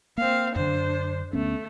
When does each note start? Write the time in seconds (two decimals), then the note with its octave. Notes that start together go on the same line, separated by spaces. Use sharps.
0.18 A#3 C4 F5
0.56 F#2 D3 D4 C5
1.33 D2 A3 B3 C#4